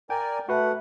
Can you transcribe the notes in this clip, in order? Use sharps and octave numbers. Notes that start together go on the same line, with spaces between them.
A#4 D5 G5 G#5
A3 F#4 B4 F#5